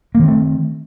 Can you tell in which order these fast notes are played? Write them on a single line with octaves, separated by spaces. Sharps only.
A#3 D#3 C4 A3